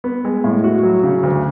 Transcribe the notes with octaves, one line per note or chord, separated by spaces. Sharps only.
B3
G#3
A2
F#4
F#3
C#3
D2